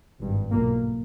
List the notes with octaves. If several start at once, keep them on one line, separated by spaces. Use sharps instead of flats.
G#1 G2
B1 A#2 A#3